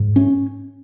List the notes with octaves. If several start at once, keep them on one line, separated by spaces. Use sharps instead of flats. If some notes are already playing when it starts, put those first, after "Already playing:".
Already playing: G#2
C#4